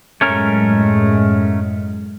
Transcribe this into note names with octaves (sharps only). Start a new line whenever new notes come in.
F#2 A2 G#3 A3 C#4 A#4